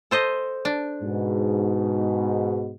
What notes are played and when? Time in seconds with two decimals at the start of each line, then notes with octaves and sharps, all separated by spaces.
0.11 A4 C5 D#5
0.65 D4
1.02 G#2 B2